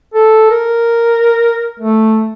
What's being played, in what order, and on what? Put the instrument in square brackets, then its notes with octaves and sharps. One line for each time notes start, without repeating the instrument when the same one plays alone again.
[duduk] A4
A#4
A3